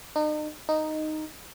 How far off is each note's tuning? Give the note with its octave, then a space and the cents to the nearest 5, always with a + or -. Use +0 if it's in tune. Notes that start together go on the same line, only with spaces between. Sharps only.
D#4 -40
D#4 -5